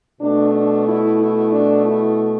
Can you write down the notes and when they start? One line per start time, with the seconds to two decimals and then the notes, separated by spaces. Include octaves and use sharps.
0.20 B2 A3 D4
0.52 D4
0.86 E4
1.18 E4
1.52 D4
1.84 E4